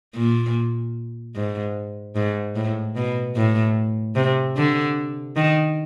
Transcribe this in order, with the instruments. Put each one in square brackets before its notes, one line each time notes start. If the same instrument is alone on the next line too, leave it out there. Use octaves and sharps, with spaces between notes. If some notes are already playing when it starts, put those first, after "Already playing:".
[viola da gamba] A#2
G#2
G#2
A2
B2
A2
C3
D3
D#3